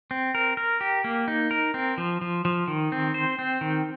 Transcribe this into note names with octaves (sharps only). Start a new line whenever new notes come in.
C4
A#4
A#4
G4
A#3
D#4
A#4
C4
F3
F3
F3
D#3
C4
C5
C4
D#3